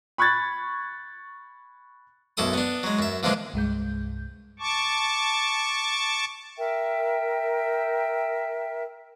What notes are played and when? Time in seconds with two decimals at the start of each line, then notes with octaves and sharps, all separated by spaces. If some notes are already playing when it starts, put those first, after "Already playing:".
0.18 B5 C#6 F#6 G#6 A6
2.37 B1 F#2 E4 A4 D#6
2.53 B3 D4
2.83 F#3 G#3
2.99 F#2 E5
3.23 A#2 D3 E3 F3 G#3 D4
3.54 C2 G2 G#3 G6
4.59 A5 C#6 D6
6.58 A#4 E5 G5